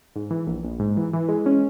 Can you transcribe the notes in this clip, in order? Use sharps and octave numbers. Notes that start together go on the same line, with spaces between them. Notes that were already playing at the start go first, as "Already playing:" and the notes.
G#2
E3
A#1
A#1
G#2
E3
E3
G#3
C#4